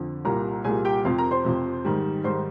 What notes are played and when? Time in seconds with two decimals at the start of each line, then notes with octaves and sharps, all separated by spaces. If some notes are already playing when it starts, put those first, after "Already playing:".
Already playing: F2 D3 F3
0.25 C2 A#2 G3 A#4 A#5
0.64 C2 A#2 G3 G#4 G#5
0.85 G4 G5
1.05 F2 C3 F3 F4 F5
1.18 A#4 A#5
1.31 C5 C6
1.45 F2 C3 F3
1.85 G#2 D#3 G3
2.24 G#2 D#3 G3 C5 C6